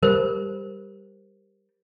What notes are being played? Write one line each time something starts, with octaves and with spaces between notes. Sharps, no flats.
G3 A#4 C5